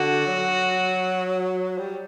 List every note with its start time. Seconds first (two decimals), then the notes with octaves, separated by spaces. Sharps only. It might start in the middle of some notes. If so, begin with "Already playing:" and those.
Already playing: D3 F#4
0.27 F#3
1.78 G3